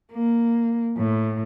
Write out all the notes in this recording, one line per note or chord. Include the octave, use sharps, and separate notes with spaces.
A#3
A2